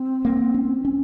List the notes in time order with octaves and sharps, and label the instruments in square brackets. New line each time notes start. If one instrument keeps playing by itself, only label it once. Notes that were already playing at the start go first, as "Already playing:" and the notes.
Already playing: [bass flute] C4
[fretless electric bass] A#3
C#4
C#4